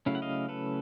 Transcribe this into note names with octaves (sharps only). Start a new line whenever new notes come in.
C#3 F#3 A3 C#4 E4 F5
F#5
D#5 F5
A4 B4